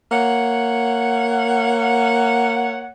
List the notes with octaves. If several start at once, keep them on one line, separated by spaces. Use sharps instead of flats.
A#3 C#5 F#5